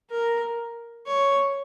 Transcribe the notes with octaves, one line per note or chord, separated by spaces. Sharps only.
A#4
C#5